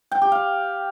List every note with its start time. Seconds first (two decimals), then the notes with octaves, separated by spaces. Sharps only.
0.12 G5
0.22 G4
0.32 F5